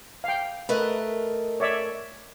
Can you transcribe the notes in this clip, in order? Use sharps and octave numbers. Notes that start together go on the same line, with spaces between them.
F5 G5
A3 A#4 B4 D#5
C#5 D5 E5